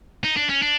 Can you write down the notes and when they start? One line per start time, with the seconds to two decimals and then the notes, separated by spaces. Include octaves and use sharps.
0.24 D#4
0.37 D4
0.49 C#4
0.62 D4